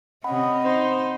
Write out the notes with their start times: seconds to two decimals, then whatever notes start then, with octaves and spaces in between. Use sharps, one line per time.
0.24 C3 C#4 D#5 F#5 B5
0.65 D#4 C5